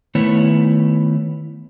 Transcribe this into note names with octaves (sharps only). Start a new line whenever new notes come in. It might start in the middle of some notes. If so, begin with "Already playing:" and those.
D#3 A3 B3 E4 B4 C#5